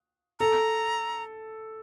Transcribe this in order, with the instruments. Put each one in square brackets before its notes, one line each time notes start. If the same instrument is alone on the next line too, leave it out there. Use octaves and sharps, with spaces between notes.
[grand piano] A4 [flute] A#5